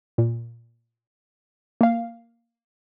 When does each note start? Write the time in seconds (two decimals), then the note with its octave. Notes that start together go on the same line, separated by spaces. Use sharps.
0.18 A#2
1.81 A#3 F5